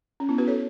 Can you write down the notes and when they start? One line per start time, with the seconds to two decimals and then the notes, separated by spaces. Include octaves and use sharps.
0.20 C#4
0.29 B3 E4
0.38 F#4 B4
0.48 A4 C#5